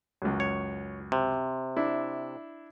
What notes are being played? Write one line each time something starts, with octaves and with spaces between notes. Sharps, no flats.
C#2 F#2
C#5
C3
D4 E4